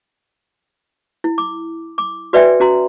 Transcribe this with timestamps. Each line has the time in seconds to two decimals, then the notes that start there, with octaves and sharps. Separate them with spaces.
1.24 E4
1.38 D6
1.98 D6
2.33 F#4 B4 D5 E5 G5 G#5
2.60 C#4 F#4 A#5 C6